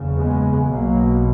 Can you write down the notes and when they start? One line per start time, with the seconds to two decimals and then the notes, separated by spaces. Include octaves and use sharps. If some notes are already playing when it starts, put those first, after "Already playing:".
Already playing: F#1 E2 C#3
0.17 G#3 B3
0.70 B1 B2 F#3 A#3